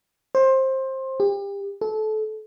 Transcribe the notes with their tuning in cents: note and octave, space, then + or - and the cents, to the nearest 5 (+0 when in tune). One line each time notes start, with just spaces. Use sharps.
C5 +20
G4 +35
A4 -25